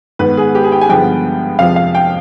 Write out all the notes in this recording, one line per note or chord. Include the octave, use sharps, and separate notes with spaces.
G#2 D#3 B3 B4
G#4
G4
G#4
G5
G#5
G2 D3 F3 G#3 B3 G5
F2 C3 F3 G#3 F5
F5
G5